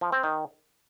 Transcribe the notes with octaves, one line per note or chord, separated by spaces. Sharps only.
F3
C4
D#3